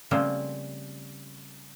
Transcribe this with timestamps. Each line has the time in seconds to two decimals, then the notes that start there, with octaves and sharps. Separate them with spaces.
0.11 C#3 F3 G3 A3 A#3 C4